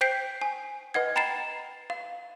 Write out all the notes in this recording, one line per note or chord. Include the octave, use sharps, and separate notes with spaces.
C5 G5 G6 B6 C7 D7
G#5
B4 D#5 F#5 G#6
G5 A#5 B5 A6 C7 E7
F5